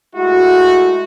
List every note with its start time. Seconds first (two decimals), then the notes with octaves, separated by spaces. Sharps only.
0.16 G#3 A3 E4 F#4